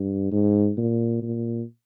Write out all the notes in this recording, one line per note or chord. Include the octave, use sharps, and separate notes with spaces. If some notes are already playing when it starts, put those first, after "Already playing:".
Already playing: G2
G#2
A#2
A#2